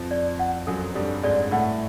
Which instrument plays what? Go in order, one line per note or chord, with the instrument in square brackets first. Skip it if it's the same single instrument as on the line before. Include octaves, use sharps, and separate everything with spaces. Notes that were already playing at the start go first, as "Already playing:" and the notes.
Already playing: [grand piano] F2 F3
[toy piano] D5
F#5
[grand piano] F#2 F#3 [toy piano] A4
[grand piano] G2 G3 [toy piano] A4
[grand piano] G#2 G#3 [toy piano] D5
[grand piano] A2 A3 [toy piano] F#5